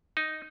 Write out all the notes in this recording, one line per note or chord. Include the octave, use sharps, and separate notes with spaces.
D#4